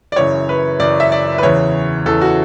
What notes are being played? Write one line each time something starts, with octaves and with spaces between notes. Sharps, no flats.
D5
F#2 C#3 E3 C#5
B4
F#2 C#3 E3 D5
E5
D5
B4
E2 C#3 E3 C#5
E2 C#3 E3 A4
F#4